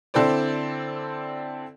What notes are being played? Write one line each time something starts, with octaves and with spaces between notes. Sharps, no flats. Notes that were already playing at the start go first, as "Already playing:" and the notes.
D3 C4 E4 A4 C5 D5